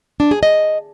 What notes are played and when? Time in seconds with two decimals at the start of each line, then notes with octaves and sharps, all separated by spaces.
0.20 D4
0.31 G#4
0.43 D#5